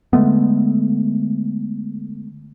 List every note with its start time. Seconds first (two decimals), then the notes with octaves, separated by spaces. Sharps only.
0.13 D3 G#3 A3 B3